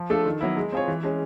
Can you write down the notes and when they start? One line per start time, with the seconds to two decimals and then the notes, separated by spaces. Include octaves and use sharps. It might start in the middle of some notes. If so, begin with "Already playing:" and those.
Already playing: F3
0.10 A3 D4 F4 A4
0.26 D#3
0.41 F#3 B3 E4
0.57 G#3
0.72 C4 F4 G#4 C#5
0.88 E3
1.03 G#3 C#4